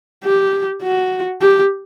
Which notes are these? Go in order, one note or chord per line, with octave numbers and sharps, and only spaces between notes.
G4
F#4
G4